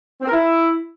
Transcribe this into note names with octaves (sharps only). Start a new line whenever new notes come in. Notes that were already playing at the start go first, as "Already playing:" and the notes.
C4
A#4
E4